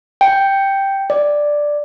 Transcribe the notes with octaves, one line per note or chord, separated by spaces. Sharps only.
G5
D5